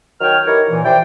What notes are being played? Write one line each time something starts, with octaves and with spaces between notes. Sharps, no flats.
D#3 F#3 C#5 G5 F6
E3 D#4 E4 G4 A#4 C#5
A#2 E3
E4 G4 C5 D5 G5